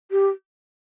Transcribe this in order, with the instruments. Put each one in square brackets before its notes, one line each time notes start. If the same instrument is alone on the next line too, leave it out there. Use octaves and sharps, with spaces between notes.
[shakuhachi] G4